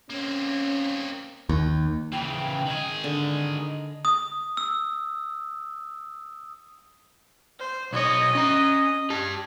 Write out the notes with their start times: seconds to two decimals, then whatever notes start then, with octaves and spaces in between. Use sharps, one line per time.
0.10 A#3 C4 C#4
1.49 D#2
2.12 C#3 E3 G5
2.67 D#3 G#4 D#5
3.04 D3
4.05 D#6
4.57 E6
7.59 C5
7.93 B1 C#5 D#5
8.35 C#4 A#5
9.10 G4 A5